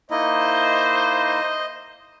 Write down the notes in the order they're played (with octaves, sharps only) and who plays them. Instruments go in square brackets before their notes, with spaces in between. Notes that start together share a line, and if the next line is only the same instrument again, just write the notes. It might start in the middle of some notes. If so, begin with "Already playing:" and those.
[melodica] A#3 D#4 E4 [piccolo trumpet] C5 [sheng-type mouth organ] D#5